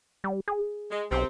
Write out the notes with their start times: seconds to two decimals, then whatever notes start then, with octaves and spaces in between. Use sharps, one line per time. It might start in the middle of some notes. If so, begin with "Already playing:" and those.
0.24 G3
0.48 G#4
0.91 G#3
1.11 B1 C3 C4